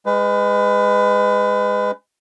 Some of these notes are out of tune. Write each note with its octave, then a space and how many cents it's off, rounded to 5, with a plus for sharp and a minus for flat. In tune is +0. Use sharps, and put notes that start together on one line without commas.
G#3 -15 B4 +30